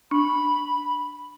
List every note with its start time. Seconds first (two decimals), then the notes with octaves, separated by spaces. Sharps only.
0.11 D4 B5